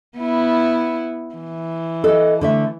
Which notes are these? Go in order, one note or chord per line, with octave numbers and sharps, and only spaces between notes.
B3 E4
E3
A4 D#5
D3 A3 E5